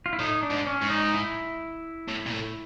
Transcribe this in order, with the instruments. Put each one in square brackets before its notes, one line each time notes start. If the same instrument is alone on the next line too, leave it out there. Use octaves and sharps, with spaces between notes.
[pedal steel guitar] F4
E4
[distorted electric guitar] A2 [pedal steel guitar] D#4
[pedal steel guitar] D4
[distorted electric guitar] G#2
[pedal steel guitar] C#4
[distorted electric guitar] G#2
[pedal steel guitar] D#4
E4
[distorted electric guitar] A2
A#2
A2